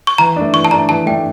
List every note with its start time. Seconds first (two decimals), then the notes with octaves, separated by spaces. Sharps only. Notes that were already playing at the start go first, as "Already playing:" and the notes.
0.07 C#6
0.18 E3 A#5
0.36 A3 D4
0.53 E3 C#6
0.65 A5
0.71 A3 D4 A#5
0.89 E3 A5
1.06 A3 D4 G5